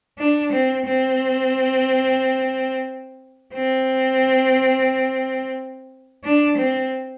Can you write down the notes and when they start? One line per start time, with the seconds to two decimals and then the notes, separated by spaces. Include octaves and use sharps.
0.18 D4
0.52 C4
0.86 C4
3.54 C4
6.24 D4
6.57 C4